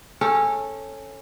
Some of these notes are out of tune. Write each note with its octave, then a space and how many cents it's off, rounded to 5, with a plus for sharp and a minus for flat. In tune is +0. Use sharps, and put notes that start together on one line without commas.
C#4 -15 A4 +0